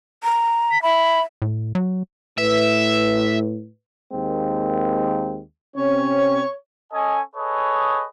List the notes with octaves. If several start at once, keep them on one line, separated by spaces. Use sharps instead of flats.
A#5
B6
E5 B5
A2
F#3
A2 B4 E5
D#2 G#3 A#3 C4
C3 C4 C#4 C#5
C#4 A4 D#5 G#5
G#4 A4 B4 C#5 D#5